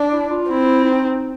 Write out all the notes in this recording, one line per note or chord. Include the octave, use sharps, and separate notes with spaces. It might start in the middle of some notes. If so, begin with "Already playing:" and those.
Already playing: D4
E4
F4
C4 E4
E4
D#4